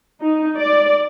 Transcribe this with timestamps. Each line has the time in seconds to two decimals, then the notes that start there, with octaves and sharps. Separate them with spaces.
0.22 D#4
0.58 D5